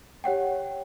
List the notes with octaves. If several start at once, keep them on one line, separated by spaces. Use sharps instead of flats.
G4 C#5 F#5 G5